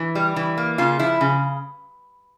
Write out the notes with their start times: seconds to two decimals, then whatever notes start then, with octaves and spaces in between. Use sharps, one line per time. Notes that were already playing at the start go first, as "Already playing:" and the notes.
Already playing: E3
0.15 G3
0.36 E3
0.58 A#3
0.78 C#3 F4
0.99 F3 E4
1.21 C#3